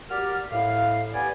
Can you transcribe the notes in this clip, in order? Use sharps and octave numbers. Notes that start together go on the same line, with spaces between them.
F#4 G4 A#4 D5 F6
A2 F5
B3 G4 D5 G#5